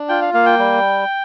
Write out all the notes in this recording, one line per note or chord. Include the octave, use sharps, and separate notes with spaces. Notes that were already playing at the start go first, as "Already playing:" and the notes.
Already playing: D4
F4 G5
F5
A#3 F5
G5
G3